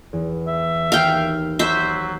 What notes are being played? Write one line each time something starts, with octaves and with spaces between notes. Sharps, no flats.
E2
E5
D#2 F5 G5
F#3 C5 E5